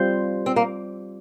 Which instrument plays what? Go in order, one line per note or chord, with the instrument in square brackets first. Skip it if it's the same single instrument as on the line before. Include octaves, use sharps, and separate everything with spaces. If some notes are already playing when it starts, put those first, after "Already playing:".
Already playing: [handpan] G3 C4 F4 C5
[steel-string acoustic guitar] C4
A#3